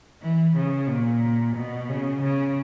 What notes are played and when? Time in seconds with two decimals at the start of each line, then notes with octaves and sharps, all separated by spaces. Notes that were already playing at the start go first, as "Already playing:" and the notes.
0.22 E3
0.56 C#3
0.88 A#2
1.56 B2
1.89 C#3
2.22 C#3